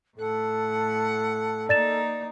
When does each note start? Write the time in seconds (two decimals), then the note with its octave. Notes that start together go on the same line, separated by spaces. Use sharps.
0.18 A2 A4 F#5
1.69 A#3 D#4 D5 A6 E7